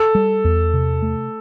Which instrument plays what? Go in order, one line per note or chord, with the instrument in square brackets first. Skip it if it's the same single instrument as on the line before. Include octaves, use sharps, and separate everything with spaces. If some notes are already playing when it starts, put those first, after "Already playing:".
Already playing: [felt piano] A4
[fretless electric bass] G3
E2
C3
A3